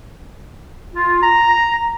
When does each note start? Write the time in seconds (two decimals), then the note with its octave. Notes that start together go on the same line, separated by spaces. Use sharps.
0.94 F4
1.23 A#5